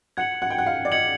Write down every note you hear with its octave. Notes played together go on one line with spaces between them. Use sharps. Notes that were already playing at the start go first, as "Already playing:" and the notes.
F#5 G#6 C#7 F#7
F#5
G5
F#5
F5
D5
D#5 G#6 C#7 F#7